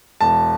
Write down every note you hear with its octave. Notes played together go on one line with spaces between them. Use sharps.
E1 A5